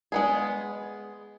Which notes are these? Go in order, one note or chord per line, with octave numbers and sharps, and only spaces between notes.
G#3 B3 G#4